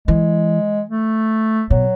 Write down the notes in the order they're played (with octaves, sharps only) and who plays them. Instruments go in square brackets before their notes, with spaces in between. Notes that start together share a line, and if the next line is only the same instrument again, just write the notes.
[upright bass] E3 [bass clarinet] G#3
[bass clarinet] A3
[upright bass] B2 [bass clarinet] F#3